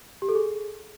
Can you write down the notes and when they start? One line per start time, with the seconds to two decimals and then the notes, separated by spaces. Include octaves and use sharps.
0.22 G4
0.29 A4
0.35 G#4